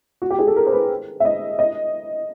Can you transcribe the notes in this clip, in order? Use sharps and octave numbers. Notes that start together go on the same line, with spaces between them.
F#4
G4
G#4
A4
A#4
C5
B4
E5
D#5
D#5